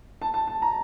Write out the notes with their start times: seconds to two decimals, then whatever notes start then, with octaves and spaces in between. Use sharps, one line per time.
0.22 A5
0.34 A5
0.47 A5
0.62 A#5